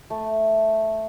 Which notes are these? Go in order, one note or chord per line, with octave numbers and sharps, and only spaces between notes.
A3